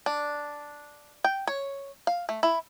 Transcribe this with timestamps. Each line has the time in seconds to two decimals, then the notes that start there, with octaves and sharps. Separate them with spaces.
0.06 D4
1.24 G5
1.47 C#5
2.07 F5
2.29 A3
2.43 E4